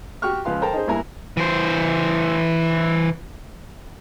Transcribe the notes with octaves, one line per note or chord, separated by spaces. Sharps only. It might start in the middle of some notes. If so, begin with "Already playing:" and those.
F#4 G4 G5 C#6 F6
C#2 F3 B4 F5 C6
A4 A#4 C5 G5 A5 A#5
D#4 G#4 C5
G2 A#3 E4 G#5 A#5
E3 C5